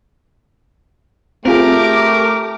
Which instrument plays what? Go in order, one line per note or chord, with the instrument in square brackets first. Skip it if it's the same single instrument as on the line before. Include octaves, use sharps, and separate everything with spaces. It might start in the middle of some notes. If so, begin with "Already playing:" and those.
[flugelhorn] A3 [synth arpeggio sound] C4 F4 G#4 [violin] G4 D6 [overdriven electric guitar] A#4